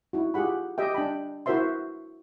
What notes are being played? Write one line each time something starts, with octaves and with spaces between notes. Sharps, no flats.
D#4 E4 F#4
F4 G4 G#4 F#5 B5
G4 D#5 E5 G5
D4 G5 A5 B5
E4 F#4 A#4 C5 E5 C6